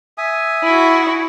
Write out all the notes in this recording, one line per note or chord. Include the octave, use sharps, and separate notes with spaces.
E5 G#5 D#6
E4 F#4